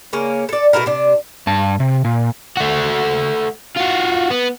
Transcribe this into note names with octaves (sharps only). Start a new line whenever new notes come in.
C#3 A#3 C#4
A4 D5
B2 A3 E4 A#4
C3 D4
G2 A5
C3
A#2
A3 F#4
F4 F#4
B3